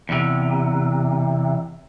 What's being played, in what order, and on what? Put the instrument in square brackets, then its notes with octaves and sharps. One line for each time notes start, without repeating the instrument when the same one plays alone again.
[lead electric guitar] E2 C3